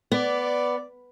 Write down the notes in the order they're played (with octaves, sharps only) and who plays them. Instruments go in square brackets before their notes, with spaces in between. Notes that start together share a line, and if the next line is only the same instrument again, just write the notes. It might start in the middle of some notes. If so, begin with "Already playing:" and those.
[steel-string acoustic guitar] B3 [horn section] D5